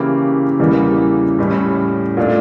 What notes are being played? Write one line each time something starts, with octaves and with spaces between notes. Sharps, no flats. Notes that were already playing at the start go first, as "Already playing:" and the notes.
Already playing: C#3 E3 A#3 E4 G4
E2 C#3 E3 G3 A#3
A2 G3 C#4
A#2 A3 D4